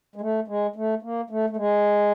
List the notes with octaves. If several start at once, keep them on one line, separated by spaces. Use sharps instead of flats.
G#3
A3
G#3
A3
A#3
A3
A3
G#3